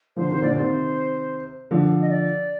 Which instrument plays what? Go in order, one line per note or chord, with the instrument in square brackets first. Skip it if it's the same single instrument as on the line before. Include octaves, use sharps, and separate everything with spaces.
[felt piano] D3 F3 [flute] C5
[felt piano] C3 D#3 [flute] C5
[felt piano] A#2 D3 [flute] D5
[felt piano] C3 D#3 [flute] C5
[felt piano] D3 F3
[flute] D#5
D5